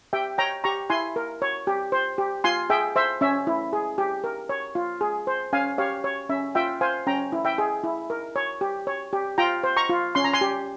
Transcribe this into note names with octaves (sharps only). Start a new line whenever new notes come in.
G4 E5 G5
C#5 G5 A#5
G4 A#5 C#6
E4 G#5 C6
A#4
C#5
G4
C5
G4
F4 G#5 C6
G#4 E5 G5
C5 E5
C#4 E5
E4
G#4
G4
A#4
C#5
F4
G#4
C5
C#4 F5 G#5
G4 C#5 F5
C#5
C#4 E5
F4 E5 G5
C5 F5 G#5
C#4 G5 A#5
E4
E5 G5
G#4
E4
A#4
C#5
G4
C#5
G4
F4 G5 A#5
C5
A#5 C#6
F4
C#4 C6
A#5
G#5 C6
G4